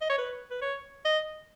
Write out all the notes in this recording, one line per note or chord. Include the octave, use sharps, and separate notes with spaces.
D#5
C#5
B4
B4
C#5
D#5